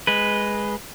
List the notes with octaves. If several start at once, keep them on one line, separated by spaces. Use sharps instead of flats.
G#3 B4